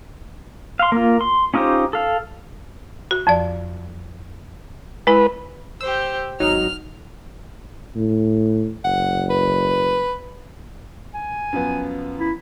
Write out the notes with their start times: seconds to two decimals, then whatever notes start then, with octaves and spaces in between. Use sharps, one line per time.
0.79 F5 C6
0.92 A#3 F4
1.21 C6
1.54 C#4 D#4 F4 G4 C5
1.93 A4 F5
3.11 F#4
3.27 F2 F3 D5
5.07 G#3 E4 B4
5.81 G4 C5 E6
6.40 G#1 F#3 D#4 F6
7.95 A2
8.85 F#1 F#5
9.30 B4
11.14 G#5
11.53 F#2 F3 B3
12.19 E4